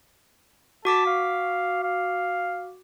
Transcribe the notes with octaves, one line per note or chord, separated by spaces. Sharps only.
F#4 A5 D6 B6
F5
F5